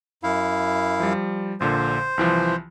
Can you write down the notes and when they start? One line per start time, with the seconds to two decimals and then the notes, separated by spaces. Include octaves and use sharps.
0.23 F#2 E4 F5
1.00 F3 G3
1.60 A#1 A#2 D3 C5
2.18 C2 E3 F3